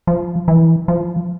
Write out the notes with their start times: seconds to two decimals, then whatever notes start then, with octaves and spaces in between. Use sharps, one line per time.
0.07 F3
0.48 E3
0.88 F3